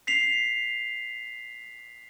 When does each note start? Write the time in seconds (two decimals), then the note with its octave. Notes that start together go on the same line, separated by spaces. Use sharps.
0.07 B6 C7 F7